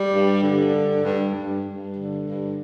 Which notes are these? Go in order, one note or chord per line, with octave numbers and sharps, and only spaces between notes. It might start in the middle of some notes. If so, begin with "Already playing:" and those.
Already playing: G3
G2
D3
G2
G2
G2
G2
D3
G2